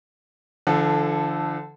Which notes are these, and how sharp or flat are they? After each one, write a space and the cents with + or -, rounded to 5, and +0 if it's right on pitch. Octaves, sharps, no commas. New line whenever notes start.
D3 +0 F3 -45 A4 -5